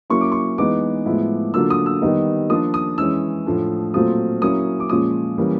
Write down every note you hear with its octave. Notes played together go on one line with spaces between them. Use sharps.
F#3 A#3 C#4 E4 C#6
D6
C#6
E3 G#3 B3 D#4 D6
A2 F3 G#3 B3 E4
D3 F#3 A#3 D4 F4 E6
D#6
E6
D#3 G3 B3 D#4
F3 A#3 D4 F4 D#6
D#6
E3 G#3 C#4 E4 E6
A2 F3 A3 D4
A#2 F#3 A3 C4 F4 D#6
F#3 A#3 C#4 E4 D#6
D6
A#2 F3 G#3 C#4 F4 D#6
E3 G3 A#3 C#4